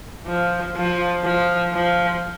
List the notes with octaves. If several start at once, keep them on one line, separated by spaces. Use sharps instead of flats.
F3
F3
F3
F3